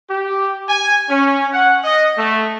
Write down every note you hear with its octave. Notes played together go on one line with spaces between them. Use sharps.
G4
G#5
C#4
F#5
D#5
A3